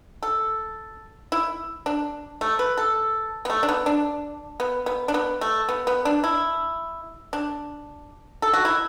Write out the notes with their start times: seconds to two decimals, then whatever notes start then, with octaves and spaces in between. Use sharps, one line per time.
0.23 A4
1.32 E4
1.86 D4
2.41 A3
2.59 B4
2.77 A4
3.45 B3
3.50 A3
3.63 D4
3.69 B3
3.86 D4
4.60 B3
4.86 B3
5.08 D4
5.14 B3
5.41 A3
5.69 B3
5.87 B3
6.05 D4
6.24 E4
7.33 D4
8.42 A4
8.53 F#4
8.65 E4